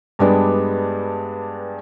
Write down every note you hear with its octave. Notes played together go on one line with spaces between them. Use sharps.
G2 G3 G#3 B3 D4